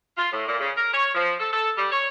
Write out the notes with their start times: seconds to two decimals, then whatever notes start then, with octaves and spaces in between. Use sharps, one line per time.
0.17 F4
0.31 A2
0.47 A#2
0.59 C#3
0.76 A#4
0.93 C#5
1.14 F3
1.39 A4
1.53 A4
1.77 G3
1.91 C#5